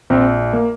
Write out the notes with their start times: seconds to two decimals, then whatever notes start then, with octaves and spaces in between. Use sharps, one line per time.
0.10 A#1 C4
0.53 A#3